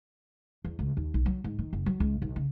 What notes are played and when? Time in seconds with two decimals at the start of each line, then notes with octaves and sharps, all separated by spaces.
0.65 E2
0.79 C#2
0.97 D#2
1.14 B1
1.26 F#3
1.44 G#2
1.59 D#3
1.73 F#1
1.86 F#3
2.00 C#2
2.22 B1
2.36 C#3